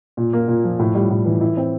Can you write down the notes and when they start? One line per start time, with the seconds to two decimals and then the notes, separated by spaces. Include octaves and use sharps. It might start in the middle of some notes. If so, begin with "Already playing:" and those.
0.17 A#2
0.33 A#3
0.48 A#2
0.64 F3
0.79 A2
0.95 G3
1.10 A2
1.26 E3
1.41 E4
1.57 C4